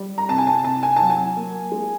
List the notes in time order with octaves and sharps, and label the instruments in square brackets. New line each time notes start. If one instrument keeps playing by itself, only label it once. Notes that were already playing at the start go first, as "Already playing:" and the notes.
Already playing: [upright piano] G3
A#5
C3 A5
G#5
A5
C3 A5
G#5
F#3 A5
G#5
A#3
G#3